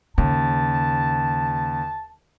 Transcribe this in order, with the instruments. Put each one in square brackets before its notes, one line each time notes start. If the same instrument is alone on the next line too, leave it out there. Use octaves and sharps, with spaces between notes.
[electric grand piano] D#2 [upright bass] C#3 [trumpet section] A5